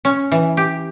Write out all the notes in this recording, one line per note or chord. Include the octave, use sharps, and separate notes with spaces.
C#4
E3
G4